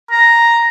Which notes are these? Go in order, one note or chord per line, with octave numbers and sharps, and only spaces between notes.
A#5